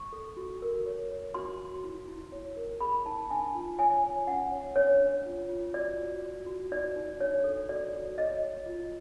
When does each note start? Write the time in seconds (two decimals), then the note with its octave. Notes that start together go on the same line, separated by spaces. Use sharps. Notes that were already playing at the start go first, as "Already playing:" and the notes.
Already playing: C#6
0.13 A4
0.37 F#4
0.62 A#4
0.86 C#5
1.10 C#5
1.34 F#4 C6
1.60 F#4
1.84 E4
2.08 E4
2.32 C#5
2.56 A#4
2.81 G#4 B5
3.06 D#4 A5
3.31 D4 G#5
3.55 F4
3.79 C#5 G#5
4.03 C#5
4.27 C#4 F#5
4.52 C#5
4.76 D4 C#5
5.01 D4
5.26 F4
5.49 F4
5.74 F#4 D5
5.99 F#4
6.22 F#4
6.46 F#4
6.71 D#4 D5
6.96 D#4
7.20 D4 C#5
7.44 A4
7.69 F#4 D5
7.93 F#4
8.18 C#5 D#5
8.42 C#5
8.66 F4